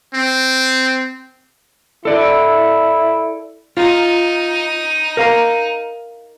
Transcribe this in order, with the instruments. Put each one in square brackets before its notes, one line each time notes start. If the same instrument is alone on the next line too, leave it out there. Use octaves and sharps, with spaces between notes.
[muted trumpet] C4
[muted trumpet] E4 [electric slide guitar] A4 D5
[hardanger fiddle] D#4 [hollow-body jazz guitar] F4
[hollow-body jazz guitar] A#4 F5 A#5